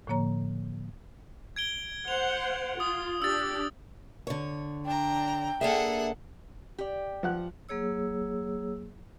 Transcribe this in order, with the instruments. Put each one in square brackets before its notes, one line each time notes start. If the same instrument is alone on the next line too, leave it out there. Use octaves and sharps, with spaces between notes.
[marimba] A2 D3 F3 A#3 C#5 A#5
[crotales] G#6 D7 G7
[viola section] C5 F#5 [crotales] F7
[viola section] F4 [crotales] D#6
[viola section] D4 G4 [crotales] E6 A6
[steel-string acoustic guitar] D3 C#5
[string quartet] D4 A#5 [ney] G5
[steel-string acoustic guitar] A#3 D4 E5 [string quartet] G#4 A4 F#5
[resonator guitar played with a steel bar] G4 D5
[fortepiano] F3 F#5 F#6
[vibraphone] F#3 A#3 G#4 C#5 E6